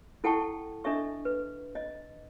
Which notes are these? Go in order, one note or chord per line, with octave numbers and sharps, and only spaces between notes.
E4 A4 F#5 G5 A5 C#6
D4 A4 D#5 E5 C#6
B4
D#5